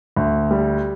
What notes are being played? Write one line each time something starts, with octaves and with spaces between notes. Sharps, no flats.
D2
G3